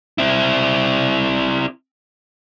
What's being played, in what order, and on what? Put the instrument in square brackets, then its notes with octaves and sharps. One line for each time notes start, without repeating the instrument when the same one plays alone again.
[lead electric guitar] C4 E4